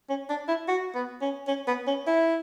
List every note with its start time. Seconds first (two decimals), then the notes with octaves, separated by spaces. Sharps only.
0.09 C#4
0.29 D4
0.48 E4
0.68 F#4
0.95 B3
1.22 C#4
1.47 C#4
1.67 B3
1.87 C#4
2.07 E4